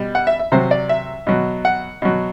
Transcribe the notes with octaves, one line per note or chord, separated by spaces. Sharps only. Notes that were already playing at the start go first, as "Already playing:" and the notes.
Already playing: B2 G3
F#5
E5
E5
C3 F#3 C5
D5
E5
B2 F#3
F#5
B2 F#3